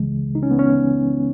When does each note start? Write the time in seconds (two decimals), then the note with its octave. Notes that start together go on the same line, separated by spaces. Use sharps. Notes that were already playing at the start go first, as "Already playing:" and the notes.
Already playing: C#2 C#3 E3 G#3
0.35 D#4
0.43 C#4
0.51 B3
0.59 C#4